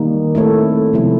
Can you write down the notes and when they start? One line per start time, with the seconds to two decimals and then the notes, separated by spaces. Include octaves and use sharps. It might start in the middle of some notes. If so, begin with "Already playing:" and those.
Already playing: D#3 G3 A#3 D#4
0.35 A3 C4 E4 A4 C#5
0.93 C3 F3 G#3 B3 E4